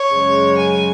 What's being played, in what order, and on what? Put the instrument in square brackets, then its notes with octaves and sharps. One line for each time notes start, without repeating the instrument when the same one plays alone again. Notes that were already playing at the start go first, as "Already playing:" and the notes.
Already playing: [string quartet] C#5
F#2 C#3 G#3
G#5